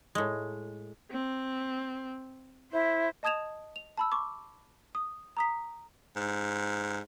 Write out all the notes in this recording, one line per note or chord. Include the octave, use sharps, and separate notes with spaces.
A2 G#3
C4
E4 C5
D#5 A5 D#6 G#6 E7 F7
F7
A5 B5 E6
C#6 D6
D#6
A#5 D#6 B6
G#2